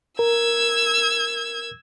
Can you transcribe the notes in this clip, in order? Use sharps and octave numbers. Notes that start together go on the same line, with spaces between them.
A#4 E6 G#6